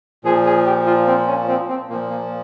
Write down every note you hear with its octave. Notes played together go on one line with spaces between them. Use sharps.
A#2 F3 G#4
G#4
G4
F4
C4
C#4
C4
C4
A#2 F3 A#3
A#3